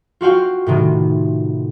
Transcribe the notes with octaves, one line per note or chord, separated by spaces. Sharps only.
F4 F#4 F5 G5
A2 C3 D#3